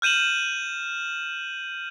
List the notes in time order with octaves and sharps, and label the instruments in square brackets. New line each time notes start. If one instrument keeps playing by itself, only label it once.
[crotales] F6 G6 D#7 E7 F#7